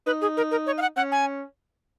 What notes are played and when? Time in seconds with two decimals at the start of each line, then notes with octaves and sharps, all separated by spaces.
0.06 D#4 B4
0.21 G#4
0.37 A#4
0.51 A#4
0.66 C#5
0.78 F5
0.82 F#5
0.97 C#4 F#5
1.12 G#5